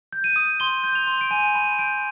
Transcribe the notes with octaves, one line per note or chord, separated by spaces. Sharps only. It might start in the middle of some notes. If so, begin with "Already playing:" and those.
G6
D#7
D#6
C6 G7
G6
F7
C6
D7
G#5 D#7
B5 D#7
G6 D7